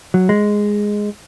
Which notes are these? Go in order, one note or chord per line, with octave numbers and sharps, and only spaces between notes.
F#3
G#3